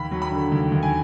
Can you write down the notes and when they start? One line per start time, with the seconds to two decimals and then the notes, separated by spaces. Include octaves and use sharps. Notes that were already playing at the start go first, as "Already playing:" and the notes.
Already playing: D#2 B5
0.11 F#3
0.22 B5
0.31 D3
0.52 D#2
0.72 D#2
0.83 G#5